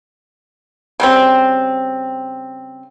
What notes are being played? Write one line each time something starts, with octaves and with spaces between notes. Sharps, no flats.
C#3 G3 C4